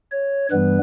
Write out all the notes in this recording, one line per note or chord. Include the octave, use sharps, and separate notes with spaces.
C#5
G2 E3 G3 B3 B4